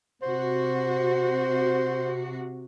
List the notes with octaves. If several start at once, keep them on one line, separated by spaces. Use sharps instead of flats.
C3 F#4 C5